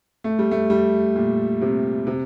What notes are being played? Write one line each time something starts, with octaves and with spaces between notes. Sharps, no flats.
A3
G3
A3
G3
A#2
C3
C3